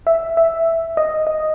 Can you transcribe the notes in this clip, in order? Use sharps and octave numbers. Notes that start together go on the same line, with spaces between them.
E5
E5
D#5
D#5